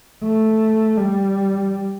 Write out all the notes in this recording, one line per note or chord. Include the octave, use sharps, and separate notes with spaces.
A3
G3